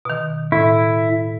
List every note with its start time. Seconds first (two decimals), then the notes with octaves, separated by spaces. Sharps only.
0.05 B2 D#3
0.52 A2 E4